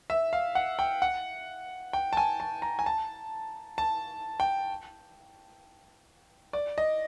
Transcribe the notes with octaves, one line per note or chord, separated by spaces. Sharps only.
E5
F5
F#5
G5
F#5
G5
A5
G#5
A5
A#5
G#5
A5
A5
G5
D5
D#5